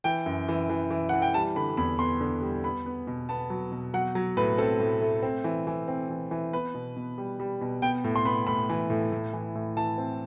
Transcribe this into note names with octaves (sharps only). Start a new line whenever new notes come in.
E3 G5
F#2
E3
E3
E3
E3 F#5
G5
G3 A5
D3 B5
E2 B5
B3 C6
D3
G3
B3 B5
B3
B2
B3 A5
F#3
B2
F#3 F#5
F#3
A2 B4
C4 A4
A2
A3
C4
E3
E3
C4
E3
E3
B3 B4
B2
B2
G3
G3
B2
B3 G5
A2
C6
B3 B5
A2 B5
E3
A2
A2
E3
A2
E3 A5
C4